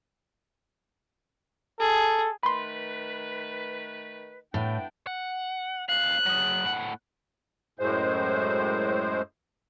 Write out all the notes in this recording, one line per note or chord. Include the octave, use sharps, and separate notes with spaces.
G#4 A4
D#3 A3 B4 B5 C6
A2 B3 D4 G5
F#5
D#2 F5 F#6
F#3 G#4
A2 F#5
F#2 A2 G#3 C5